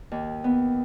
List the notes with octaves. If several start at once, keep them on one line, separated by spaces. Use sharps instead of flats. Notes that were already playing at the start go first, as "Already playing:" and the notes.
D#2
B3